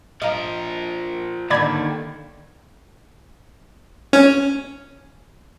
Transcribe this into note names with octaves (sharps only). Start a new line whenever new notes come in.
F3 A#4 D#5 F5
D#2 D3 D#3 D5 B5 G#6
C#4